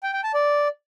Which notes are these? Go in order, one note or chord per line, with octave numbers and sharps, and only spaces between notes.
G5
G5
A5
D5